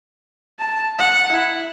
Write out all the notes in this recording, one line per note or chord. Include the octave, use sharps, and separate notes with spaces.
A5
F#5
E4